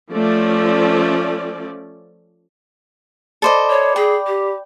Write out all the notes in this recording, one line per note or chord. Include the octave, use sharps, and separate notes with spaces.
F3 A3 C#4 D5
A4 C5 D5 D#5 B5 D6
C#5
G#4 G5
G4